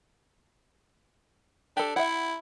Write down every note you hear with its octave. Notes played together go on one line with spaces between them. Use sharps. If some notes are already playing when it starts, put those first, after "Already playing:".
D4 G4 A4
E4 E5 F#5